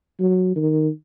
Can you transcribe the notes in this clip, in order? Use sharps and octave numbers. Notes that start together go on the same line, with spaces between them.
F#3
D#3